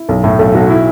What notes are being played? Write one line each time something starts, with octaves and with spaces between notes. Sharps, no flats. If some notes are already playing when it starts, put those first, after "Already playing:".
Already playing: E4
B1
A2
B1 A4
B1 F#4
E4